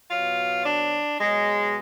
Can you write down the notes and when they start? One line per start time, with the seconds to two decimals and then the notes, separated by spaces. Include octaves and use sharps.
0.11 B2 F#3 F4
0.66 D4
1.19 B2 F#3 G#3